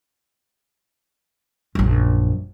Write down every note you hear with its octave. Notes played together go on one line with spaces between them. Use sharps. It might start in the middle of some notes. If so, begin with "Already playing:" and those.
A#1 F#2